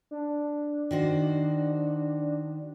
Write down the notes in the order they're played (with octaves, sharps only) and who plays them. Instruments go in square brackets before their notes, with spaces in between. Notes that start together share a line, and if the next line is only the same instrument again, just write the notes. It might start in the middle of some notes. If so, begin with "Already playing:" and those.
[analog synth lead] D4
[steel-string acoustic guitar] D#3 F#4 C5